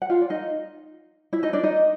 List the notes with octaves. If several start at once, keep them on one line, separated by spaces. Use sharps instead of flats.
F#5
F4 F5
D5
D#4 D#5
E4 E5
D#4 D#5
D4 D5
D#4 D#5